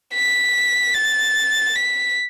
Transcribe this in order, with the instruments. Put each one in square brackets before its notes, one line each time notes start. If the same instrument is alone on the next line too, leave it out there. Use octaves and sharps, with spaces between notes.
[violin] B6
A6
B6